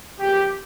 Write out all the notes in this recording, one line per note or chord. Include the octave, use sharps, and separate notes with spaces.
E2 C#3 F3 A#3 F4 G4